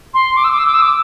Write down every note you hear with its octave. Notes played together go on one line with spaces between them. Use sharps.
C6
D6
E6
D6
E6
D6
E6
D6